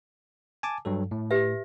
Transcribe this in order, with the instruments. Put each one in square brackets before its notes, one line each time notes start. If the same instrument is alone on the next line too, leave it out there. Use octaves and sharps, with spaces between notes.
[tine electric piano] G#5 A5 D6
G2 F#3 A4
A2
[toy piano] G4 B4 E5